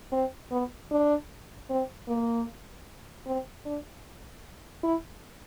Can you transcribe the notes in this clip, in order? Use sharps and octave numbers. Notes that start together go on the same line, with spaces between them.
C4
B3
D4
C4
A#3
C4
D4
E4